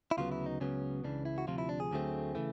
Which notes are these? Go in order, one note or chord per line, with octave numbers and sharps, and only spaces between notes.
E4
D2 C#3 F#3 B3 F4
E4
D#4
C#2 C#3 F#3 B3 C#4
C#2 C#3 E3 D4
E4
F#4
D2 C3 F3 F4
E4
D4
G#4
D2 D3 F#3 A3 C4
C#3 E3 A3